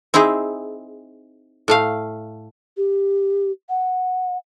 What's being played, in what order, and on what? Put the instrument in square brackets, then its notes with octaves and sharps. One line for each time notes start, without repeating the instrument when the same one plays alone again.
[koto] C4 D#4 E4 G#4
A2 A3 F5
[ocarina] G4
F#5